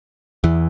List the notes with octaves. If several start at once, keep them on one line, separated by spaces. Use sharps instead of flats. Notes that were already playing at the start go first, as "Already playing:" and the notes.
E2 E3